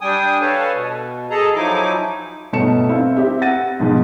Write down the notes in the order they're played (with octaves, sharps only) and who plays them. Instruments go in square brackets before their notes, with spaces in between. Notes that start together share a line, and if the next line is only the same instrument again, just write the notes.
[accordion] G3 D4 G5 G#5 D#6
A4 B4 C#5 F5 G#5 A5
B2
G#4 A4 D#5 A5 A#5
F3 F#3 D#4 E4 G#5 D6
[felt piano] G1 B2 A3 A5 C#7 E7
C4 E4 F5
C4 G4 E5
F#5 A6 A#6 D#7
G#2 B2 F3